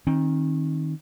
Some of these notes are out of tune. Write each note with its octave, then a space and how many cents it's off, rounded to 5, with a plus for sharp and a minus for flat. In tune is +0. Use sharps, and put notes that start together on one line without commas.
D#3 +5 C4 +40